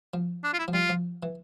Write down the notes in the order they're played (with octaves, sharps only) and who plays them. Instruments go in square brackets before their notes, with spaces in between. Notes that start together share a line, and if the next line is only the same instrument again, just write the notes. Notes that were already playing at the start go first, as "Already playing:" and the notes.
[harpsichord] F3
[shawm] D4
F4
E4
[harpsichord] F3
[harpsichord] G3 [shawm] F4
[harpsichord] F3
E3